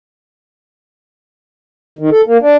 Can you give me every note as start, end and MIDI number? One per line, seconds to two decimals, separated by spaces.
1.99 2.10 51
2.11 2.21 69
2.27 2.37 58
2.42 2.57 62